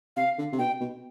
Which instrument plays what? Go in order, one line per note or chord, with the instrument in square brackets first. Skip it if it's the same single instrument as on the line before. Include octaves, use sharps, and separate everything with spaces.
[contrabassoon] C3 [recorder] F5
[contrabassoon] D3
C3
[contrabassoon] B2 [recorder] G5
[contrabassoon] B2